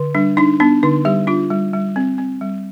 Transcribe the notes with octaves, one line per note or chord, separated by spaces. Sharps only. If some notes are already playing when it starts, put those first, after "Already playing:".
Already playing: D3
G3 D4
D4 D#4
B3 D4
D3 D#4
G3 G4
D4 F4
G3
G3
C4
C4
G3